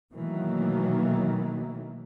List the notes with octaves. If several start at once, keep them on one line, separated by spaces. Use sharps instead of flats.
B2 D#3 E3 F#3 A3 A#3